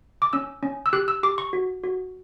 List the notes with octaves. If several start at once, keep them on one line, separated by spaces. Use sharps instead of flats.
D6
C#4 E6
C#4
E6
G4 F#6
E6
G4 D6
C#6
F#4
F#4